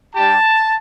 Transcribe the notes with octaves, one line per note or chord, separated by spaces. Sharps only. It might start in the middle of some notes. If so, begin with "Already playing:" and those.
G3 D4 G4 A5